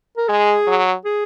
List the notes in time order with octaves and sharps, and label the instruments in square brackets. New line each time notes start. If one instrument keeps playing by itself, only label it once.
[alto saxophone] A#4
[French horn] G#3 [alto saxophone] G#4
[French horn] F#3
[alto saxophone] G#4